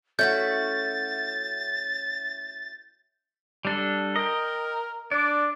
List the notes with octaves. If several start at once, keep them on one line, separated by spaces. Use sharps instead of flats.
A3 C#4 E4 F#4 G6 A6
G3 D4 A4
A#4 D#5 G5
D4 D5